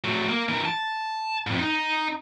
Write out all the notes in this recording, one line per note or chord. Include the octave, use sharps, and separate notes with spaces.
F#3 A3
A#3
E3 A#4
A5
F2 G#2
D#4